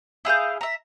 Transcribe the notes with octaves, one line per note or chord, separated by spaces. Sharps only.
E4 G#4 F5 G6
E5 A#5